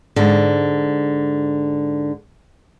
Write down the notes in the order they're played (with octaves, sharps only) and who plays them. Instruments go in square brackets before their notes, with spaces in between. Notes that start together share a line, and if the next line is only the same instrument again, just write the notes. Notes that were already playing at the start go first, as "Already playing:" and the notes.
[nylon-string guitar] G#2 D3